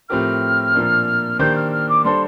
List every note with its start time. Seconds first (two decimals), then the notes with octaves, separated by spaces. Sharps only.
0.09 A2 F3 C4 G4 A#4 F6
0.75 A#2 F3 A#3 D4
1.39 D#3 A#3 D4 G4 C5 G6
1.55 F6
1.72 F6
1.89 D6
2.04 G3 D4 A4 C5 C6